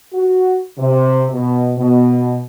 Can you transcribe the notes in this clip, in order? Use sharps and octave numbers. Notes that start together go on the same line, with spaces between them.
F#4
C3
B2
B2